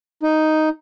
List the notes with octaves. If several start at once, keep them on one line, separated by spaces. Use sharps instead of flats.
D#4